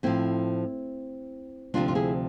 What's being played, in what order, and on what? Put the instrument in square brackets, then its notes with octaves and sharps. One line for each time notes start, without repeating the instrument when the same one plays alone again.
[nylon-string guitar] A2 F3 C4 E4
D2 C3 F3 D4 F4
F4
E4 G#4